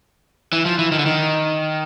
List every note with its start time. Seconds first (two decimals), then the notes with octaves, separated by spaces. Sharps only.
0.53 E3
0.66 F3
0.79 E3
0.92 D#3
0.99 D3
1.06 D#3